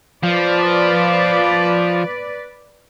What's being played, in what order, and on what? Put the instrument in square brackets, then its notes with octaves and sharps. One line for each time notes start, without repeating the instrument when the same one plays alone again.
[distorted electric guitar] F3 [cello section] B4 D5